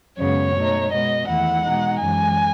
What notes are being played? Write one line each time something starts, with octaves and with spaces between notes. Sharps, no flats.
F#2 C#3 G#3 B3 C#5
B2 A3 D#4
B2 G#3 B3 D#5
E2 D#3 A3 E4 F#5
B2 G#3 D#4
F#2 E3 G#3 G#5